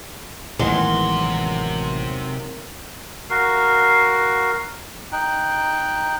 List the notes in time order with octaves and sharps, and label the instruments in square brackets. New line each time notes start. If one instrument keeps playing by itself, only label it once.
[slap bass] A1 E2 E3 [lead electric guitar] C3 C6 [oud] D#3 F#3 G#3
[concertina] F#4 A#4 F5
D#4 G5 F#6